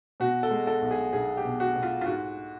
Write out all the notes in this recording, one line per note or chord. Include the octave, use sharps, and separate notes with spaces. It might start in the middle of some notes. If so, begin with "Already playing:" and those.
B2 F#4
A4
G#3
A4
B1
G#4
B1 G#4
G4
B2
F#4
B2
F4
F4
G#2 F#4